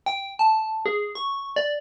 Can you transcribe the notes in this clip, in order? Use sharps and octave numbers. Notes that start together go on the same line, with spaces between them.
G5
A5
G#4
C#6
D5